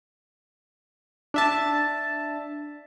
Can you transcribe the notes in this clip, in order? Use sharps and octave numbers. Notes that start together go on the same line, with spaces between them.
D4 E5 A5